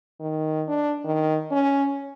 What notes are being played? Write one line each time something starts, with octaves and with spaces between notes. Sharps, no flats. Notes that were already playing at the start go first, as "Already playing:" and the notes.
D#3
D4
D#3
C#4